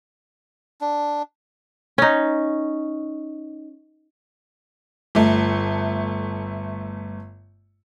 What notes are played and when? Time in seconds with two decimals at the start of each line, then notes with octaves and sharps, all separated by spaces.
0.81 D4
1.98 C#4 D#4
5.15 G1 A3